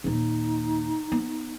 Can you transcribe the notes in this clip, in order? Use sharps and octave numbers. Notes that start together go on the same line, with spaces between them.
D#2 A#2 D#4
B3